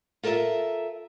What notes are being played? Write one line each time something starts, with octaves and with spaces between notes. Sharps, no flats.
F4 A4 A#4 D5 E5